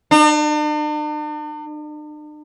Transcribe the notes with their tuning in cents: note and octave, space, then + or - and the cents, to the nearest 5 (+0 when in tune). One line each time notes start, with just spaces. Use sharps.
D4 +45